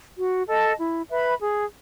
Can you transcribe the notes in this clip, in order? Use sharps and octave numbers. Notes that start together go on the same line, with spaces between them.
F#4
A4 D#5 A5
E4
B4 E5 B5
G#4